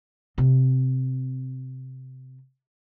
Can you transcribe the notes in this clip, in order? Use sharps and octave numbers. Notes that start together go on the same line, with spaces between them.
C3 C4